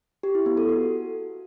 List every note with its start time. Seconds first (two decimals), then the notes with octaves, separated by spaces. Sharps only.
0.23 G4
0.35 E4
0.46 B3
0.57 A4
0.69 F#4